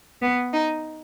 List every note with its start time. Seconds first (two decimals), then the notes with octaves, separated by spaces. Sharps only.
0.22 B3
0.52 D#4